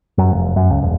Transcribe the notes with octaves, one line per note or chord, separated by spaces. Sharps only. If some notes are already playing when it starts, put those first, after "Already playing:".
F#2
F1
F#2
C#2
E1